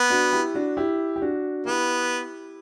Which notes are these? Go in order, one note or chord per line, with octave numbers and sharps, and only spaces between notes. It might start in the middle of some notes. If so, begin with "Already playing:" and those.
Already playing: B3
D4 F#4
E4 G4
D4 F#4
E4 G4
G4
D4 F#4
B3 E4 G4